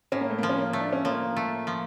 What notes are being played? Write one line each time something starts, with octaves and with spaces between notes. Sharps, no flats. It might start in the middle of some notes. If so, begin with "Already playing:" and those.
A2 C#4
A#3
A3
A#3
F3
C#4
A#3
A3
D4
C#4
F3 A#3
A3
F3